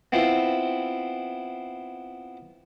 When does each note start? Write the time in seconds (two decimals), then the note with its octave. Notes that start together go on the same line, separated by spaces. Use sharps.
0.12 B3 C4 E4 F4 C5